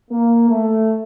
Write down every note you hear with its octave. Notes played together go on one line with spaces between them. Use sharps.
A#3
A3